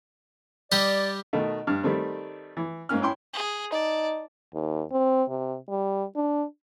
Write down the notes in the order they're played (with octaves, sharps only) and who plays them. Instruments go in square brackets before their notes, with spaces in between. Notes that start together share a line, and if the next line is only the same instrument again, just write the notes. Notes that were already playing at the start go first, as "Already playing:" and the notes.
[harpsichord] G3 G4 D#5 [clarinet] D5
[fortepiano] B2 D#3 A3
G2 F6
D#3 G3 A3 C4
E3
G#2 A#3 C#4 F6
C#4 E4 G5 C6
[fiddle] G#4
[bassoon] D#4 [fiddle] D5 A5
[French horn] D#2
C4
C3
G3
D4